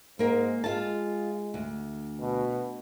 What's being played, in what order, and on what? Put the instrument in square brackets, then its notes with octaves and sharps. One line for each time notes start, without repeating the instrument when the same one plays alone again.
[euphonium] G#2 [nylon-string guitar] A#3 A#4
[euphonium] G#3 [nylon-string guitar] F4 A5
[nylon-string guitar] D2
[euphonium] B2